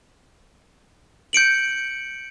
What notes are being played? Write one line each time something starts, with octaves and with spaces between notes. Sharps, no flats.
G6 C#7 D7 F#7